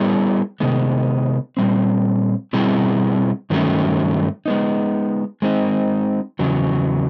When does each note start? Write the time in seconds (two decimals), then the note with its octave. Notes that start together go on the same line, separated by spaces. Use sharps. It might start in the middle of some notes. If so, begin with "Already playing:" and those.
Already playing: G3 B3 E4 G#4 C#5
0.60 C3 D#3 G#3 B3
1.57 A#2 G3 C4
2.53 B2 G3 C4 E4 G#4
3.50 G2 D#3 F#3 A3 C#4
4.46 G#3 B3 D#4
5.42 G#3 C4 D#4
6.39 E2 C#3 F#3